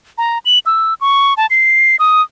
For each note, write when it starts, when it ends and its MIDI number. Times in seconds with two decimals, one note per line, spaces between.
0.18 0.38 82
0.45 0.59 102
0.66 0.94 88
1.01 1.34 85
1.37 1.46 81
1.50 1.96 96
1.99 2.22 87